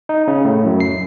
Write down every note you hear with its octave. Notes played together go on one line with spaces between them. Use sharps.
D#4
C#3
A2
F#2
C7